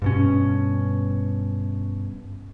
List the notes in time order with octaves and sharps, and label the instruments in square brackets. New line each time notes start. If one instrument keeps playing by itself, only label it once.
[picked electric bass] G2 B2 C#4